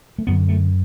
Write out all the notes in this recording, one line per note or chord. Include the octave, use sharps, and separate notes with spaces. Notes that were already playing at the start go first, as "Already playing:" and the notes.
A3
F#2 D3 B3
A3